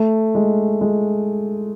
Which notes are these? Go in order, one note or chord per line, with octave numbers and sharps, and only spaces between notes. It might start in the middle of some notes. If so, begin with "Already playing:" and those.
Already playing: A3
G#3
G#3